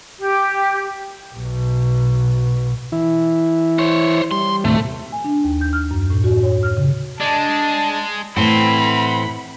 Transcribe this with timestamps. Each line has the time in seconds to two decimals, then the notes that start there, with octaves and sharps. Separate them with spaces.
0.20 G4
1.36 B1 B2
2.92 E3 E4
3.79 C5 C#5
4.31 G3 C6
4.65 D#2 A2 C3 A3
5.12 G#5
5.24 D4
5.45 D#2
5.61 G6
5.73 F6
5.91 F#2
6.10 A2
6.24 F#4
6.43 C#5
6.63 F6
6.77 C#3
7.20 G#3 D4 A5
8.37 A2 E3 C4 F#5 B5 C6